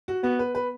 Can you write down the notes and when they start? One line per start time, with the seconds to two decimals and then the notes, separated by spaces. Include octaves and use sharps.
0.08 F#4
0.23 B3 F#4
0.39 B4
0.55 B4